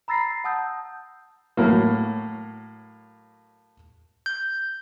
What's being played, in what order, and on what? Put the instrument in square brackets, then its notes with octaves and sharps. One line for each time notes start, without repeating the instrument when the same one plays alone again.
[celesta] A#5 B5 E6 A6 A#6 C7
F#5 A5 D#6 E6 G6
[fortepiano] A2 F#3 A#3
[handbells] G6